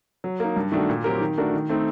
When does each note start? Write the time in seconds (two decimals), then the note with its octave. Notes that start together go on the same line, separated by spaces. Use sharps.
0.24 F#3
0.40 A#3 D#4
0.56 G2
0.72 D#3 A3 D4 F#4
0.89 A#2
1.04 F#3 C4 G4 A#4
1.21 D#3
1.38 A3 D4 F#4 A#4
1.54 D#3
1.69 A3 C4 D#4